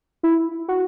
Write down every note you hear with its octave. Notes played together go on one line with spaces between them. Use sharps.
E4
F#4